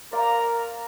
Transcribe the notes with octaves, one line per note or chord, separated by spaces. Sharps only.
A#3 A#4 C5 D5 A#5